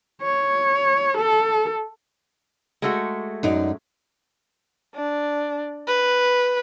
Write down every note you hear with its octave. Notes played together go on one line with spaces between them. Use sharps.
C#5
A4
G#3 A3 F#4
F#2 D#4 D5
D4
B4